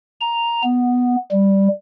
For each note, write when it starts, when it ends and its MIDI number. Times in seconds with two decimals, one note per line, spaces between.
0.21 0.62 82
0.63 1.16 59
1.31 1.68 55